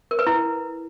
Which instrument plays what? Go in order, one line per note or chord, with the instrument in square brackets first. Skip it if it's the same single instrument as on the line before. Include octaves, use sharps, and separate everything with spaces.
[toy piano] A#4
B4
E4